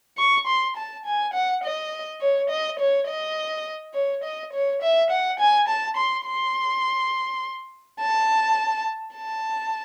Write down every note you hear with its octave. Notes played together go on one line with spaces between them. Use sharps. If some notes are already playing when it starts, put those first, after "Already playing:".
C#6
C6
A5
G#5
F#5
D#5
C#5
D#5
C#5
D#5
C#5
D#5
C#5
E5
F#5
G#5
A5
C6
C6
A5
A5